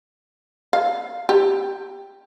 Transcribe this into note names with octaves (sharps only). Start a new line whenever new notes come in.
F5
G4